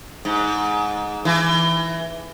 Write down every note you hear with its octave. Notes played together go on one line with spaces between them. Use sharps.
G#2
E3